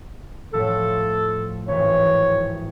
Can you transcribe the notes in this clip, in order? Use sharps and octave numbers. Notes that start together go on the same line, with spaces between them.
A2 F3 A3 A4
G#1 E3 C#5